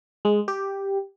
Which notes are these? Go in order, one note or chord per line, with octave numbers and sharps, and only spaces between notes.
G#3
G4